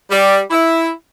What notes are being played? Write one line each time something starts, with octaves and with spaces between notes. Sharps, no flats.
G3
E4